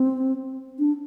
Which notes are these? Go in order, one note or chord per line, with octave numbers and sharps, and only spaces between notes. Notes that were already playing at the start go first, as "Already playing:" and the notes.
Already playing: C4
D4